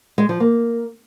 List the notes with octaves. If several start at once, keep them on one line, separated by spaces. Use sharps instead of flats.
G#3
F3
A#3